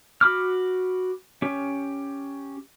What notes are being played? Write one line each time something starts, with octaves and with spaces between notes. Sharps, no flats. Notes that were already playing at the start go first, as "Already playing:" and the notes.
F#4 B5 D6 F6
C#4 G4